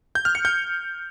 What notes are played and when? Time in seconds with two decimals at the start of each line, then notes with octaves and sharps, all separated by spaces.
0.15 G6
0.25 F6
0.35 C#7
0.45 G6